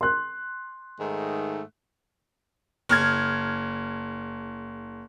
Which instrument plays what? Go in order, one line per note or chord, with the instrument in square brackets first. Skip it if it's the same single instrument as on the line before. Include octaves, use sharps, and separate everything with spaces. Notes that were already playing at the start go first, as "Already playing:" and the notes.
[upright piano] C6 F#6
[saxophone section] G#2 D#3 A3
[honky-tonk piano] F#1 F6 G#6